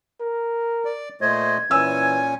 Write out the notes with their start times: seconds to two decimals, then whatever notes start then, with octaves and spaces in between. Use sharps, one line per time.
0.20 A#4
0.85 D5
1.21 A#2 A3 C5 D#5 G#6
1.71 A#2 E3 C#4 G#5 E6